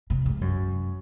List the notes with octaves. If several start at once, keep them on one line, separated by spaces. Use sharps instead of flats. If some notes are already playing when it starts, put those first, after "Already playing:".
C3
G#2
F#2